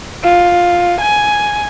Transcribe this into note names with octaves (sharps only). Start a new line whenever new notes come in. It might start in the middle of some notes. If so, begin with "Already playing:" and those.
F4
G#5